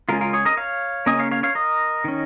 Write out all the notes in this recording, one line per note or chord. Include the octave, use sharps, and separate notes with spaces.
C#3 G#3 C#4 F4 A#4
F4 A#4
G#4 C#5
A#4 D#5
C#5 F5
C#3 A#3 C#4 D#5 G#5
C#5 F5
C#5 F5
C#5 F5
A#4 D#5
D#3 C#4